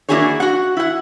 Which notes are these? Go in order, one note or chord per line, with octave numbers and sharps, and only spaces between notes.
A#3 D4 E4 F#4 G#4 C#5
F#4 F#5
E4 F#5